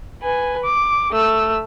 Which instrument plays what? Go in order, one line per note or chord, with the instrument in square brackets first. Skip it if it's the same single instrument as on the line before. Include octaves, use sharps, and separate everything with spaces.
[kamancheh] B4 G#5
D6
A3 E6